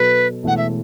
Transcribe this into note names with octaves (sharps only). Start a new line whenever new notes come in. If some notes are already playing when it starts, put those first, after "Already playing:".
Already playing: B2 F#3 B3 A4 B4
E1 E2 E3 A3 F#5
E5